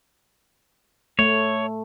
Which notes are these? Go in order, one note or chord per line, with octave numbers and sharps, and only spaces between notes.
A3 C#5